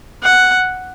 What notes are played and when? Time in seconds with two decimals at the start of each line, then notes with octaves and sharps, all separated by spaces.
0.23 F#5